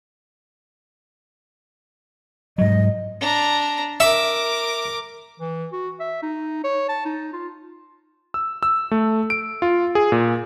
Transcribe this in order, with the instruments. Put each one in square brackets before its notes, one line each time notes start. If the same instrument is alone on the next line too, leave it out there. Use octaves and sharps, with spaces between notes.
[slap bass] G#2 F#3 [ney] D#5
[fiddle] D4 A#5
[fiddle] A#4 D6 [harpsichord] E5
[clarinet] E3
F#4
E5
D#4
C#5
A5
D#4
F4
[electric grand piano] E6
E6
A3
D7
F4
G#4
A#2